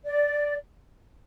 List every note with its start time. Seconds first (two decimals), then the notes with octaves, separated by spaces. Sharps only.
0.05 D5